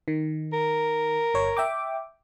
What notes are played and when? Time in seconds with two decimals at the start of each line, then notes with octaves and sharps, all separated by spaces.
0.08 D#3
0.53 A#4
1.34 G1 C#5
1.57 E5 G5 D6